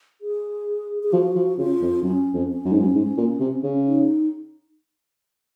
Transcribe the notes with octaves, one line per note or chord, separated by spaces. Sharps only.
G#4
G#4
F3 F#4
F3
C#3 F4
F2
F#2 C#4
F2
C#4
F#2
G#2
F#2
G#2
A#2
C3
C#3
D#4